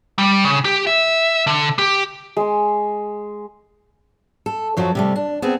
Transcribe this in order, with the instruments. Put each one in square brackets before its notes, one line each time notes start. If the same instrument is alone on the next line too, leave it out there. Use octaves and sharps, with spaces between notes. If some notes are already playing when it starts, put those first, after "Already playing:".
[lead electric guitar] G3
C#3
G4
E5
D3
G4
[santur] G#3 C6
[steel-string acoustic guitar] A4
F#2 F3 F#3
C3 G3 A3
D4
B3 C4 G#4